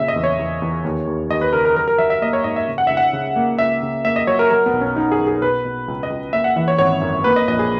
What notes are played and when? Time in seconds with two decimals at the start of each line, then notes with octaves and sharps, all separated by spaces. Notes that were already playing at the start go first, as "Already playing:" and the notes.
Already playing: A#2 C#3 E5
0.08 D#5
0.16 E2
0.24 C#5
0.39 E2
0.62 E2
0.84 D#2
1.07 D#2
1.30 D#2 D#5
1.41 B4
1.53 C#3 A#4
1.65 A#4
1.76 F#3 A#4
1.88 A#4
1.98 F#3 E5
2.10 E5
2.22 A#3 D#5
2.33 C#5
2.44 G#2 D#5
2.56 E5
2.68 C#3
2.78 F#5
2.87 C#2 E5
2.97 F#5
3.13 C#3
3.36 A#3
3.59 C#2 E5
3.82 C#3
4.05 A#3 E5
4.16 D#5
4.27 F#3 C#5
4.39 A#4
4.51 F#3 A#4
4.66 B3
4.73 B1
4.81 C#4
4.96 F#3 D#4
5.12 G#4
5.19 B1
5.27 G#4
5.41 B2 B4
5.65 B2
5.88 C#2
6.03 D#5
6.10 C#2
6.33 A#3 E5
6.44 F#5
6.56 E3 E5
6.68 C#5
6.78 G#1 C#5
7.01 F#2
7.24 A#3 B4
7.36 D#5
7.48 A#1 D#5
7.59 G#4